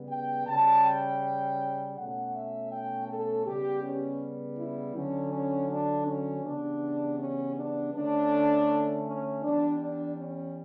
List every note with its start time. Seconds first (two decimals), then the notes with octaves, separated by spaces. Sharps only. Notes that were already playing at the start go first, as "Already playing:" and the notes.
Already playing: C#3 G3 B3
0.10 G5
0.47 C#3 G3 C#4 A5
0.84 G5
1.96 B2 A3 C#4 F#5
2.34 E5
2.71 G5
3.08 A4
3.45 C#3 G3 B3 G4
3.83 C#4
4.58 E4
4.95 D3 F#3 C#4
5.32 C#4
5.69 D4
6.06 C#4
6.44 C#3 E3 G3 B3 D4
7.19 C#4
7.56 D4
7.94 D3 A3 C#4 D4
9.05 C#4
9.43 E3 G3 B3 D4
9.79 D4
10.16 C#4